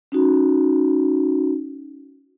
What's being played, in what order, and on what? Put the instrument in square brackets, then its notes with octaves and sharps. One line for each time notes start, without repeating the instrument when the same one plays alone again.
[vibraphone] C#4 D#4 F#4